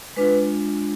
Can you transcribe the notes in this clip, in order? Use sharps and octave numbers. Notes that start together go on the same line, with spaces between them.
G#3 D4 F4 B4